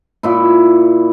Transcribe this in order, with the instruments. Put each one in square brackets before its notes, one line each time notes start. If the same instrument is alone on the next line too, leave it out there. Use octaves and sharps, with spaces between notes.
[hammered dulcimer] A#2 E4